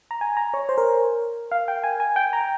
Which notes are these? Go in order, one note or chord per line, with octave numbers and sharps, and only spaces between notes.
A#5
G#5
A#5
C#5
C5
A#4
F5
G5
G#5
G#5
G5
A#5